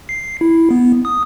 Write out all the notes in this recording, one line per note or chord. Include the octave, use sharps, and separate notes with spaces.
C7
E4
B3
D#6